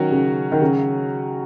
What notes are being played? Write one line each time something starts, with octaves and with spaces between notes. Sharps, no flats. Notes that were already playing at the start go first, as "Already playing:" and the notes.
Already playing: D#3 F#3 C#4 F#4
C#3
D#3
C#3